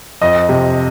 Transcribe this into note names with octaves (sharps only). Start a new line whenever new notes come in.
F2 D#5
C3